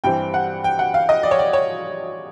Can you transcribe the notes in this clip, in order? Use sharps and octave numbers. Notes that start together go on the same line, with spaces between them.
G2 E3 G3 C4 G5
F#5
G5
F#5
F5
D#5
D5
C#5
D5
C#5